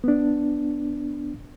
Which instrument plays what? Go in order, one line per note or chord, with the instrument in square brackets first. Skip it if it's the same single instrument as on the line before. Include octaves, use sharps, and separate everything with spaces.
[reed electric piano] B3 D4